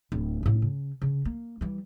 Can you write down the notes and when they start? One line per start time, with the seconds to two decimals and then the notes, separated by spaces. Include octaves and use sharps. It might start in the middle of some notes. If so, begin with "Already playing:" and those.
0.12 D1
0.43 A2 C#4
0.62 C#3
1.02 C#3
1.25 A#3
1.61 E3 G3